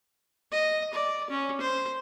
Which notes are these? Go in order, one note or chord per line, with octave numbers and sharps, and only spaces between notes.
D#5
D5
C#4
C5